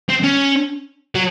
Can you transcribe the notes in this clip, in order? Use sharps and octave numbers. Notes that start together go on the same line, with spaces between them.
C4
C#4
F#3